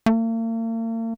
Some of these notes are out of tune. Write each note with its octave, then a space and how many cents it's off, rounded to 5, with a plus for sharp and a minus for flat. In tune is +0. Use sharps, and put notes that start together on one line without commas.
A#3 -45